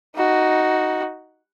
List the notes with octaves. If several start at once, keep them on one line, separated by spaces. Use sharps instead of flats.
D#4 F#4